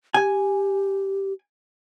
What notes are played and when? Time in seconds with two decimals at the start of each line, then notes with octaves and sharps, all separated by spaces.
0.14 G4 G#5